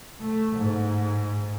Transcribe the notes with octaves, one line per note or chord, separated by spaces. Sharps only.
A3
G#2